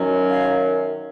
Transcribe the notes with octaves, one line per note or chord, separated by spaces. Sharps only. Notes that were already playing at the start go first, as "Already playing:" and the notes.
Already playing: F#2 D#3 F#3 C#4
F5